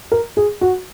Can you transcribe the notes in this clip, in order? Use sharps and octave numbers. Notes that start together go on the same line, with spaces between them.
A#4
G#4
F#4